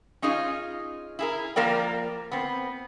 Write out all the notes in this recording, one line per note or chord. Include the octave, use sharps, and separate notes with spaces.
C#4 D#4 F4 G#4 D#5
E4 G#4 A#4
F3 A#3 A#4 D5 G5
B3 C4